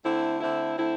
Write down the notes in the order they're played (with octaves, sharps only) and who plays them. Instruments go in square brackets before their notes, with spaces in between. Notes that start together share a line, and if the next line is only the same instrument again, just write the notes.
[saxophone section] D3 A3 C4 E4
D3 A3 C4 E4
D3 A3 C4 E4